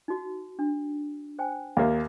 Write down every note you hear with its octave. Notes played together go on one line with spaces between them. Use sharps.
D#4 F#4
D4
C5 G5 G#5
D#2 A#3 E5